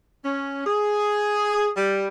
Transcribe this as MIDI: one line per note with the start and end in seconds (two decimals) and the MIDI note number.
0.24 0.64 61
0.65 1.69 68
1.77 2.08 55